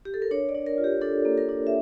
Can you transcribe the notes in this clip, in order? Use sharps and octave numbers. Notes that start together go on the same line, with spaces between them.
G4
A4
A#4
D4 C#5
D5
D4
A#4
F4
G4
D4 A4
A#3
A#4
D4
E5